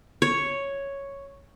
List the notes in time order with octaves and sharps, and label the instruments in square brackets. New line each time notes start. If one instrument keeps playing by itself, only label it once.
[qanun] C#5